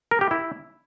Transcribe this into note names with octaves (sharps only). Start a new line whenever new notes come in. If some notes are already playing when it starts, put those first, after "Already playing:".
A#4
G4
E4